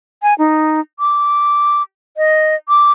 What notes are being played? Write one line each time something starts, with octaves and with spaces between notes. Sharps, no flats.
G#5
D#4
D6
D#5
D6